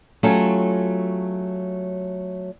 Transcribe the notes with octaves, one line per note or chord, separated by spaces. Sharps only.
F#3 A3 C#4 F4 G4 A4